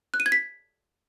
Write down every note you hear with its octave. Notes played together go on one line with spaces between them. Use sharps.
F#6
D#7
G#6
B6